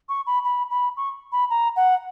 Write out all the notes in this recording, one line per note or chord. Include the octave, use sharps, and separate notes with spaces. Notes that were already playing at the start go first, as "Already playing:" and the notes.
C#6
B5
B5
B5
C#6
B5
A#5
F#5